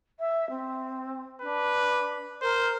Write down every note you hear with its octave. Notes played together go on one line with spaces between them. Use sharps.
E5
C4
D4 B4
A#4 C5